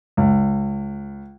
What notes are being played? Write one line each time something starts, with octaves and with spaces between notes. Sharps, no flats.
C#2